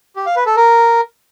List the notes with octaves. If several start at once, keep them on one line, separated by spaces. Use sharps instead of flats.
G4
F5
B4
A4
A#4